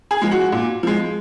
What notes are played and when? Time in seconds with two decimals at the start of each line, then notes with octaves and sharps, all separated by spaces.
0.11 G#4
0.22 F3 G#3
0.31 F#4
0.52 A#2
0.83 F3 G#3